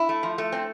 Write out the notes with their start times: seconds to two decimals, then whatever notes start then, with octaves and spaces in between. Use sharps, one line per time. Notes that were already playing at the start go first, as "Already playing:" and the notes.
Already playing: E4
0.09 A3
0.23 F3
0.38 A3
0.52 C4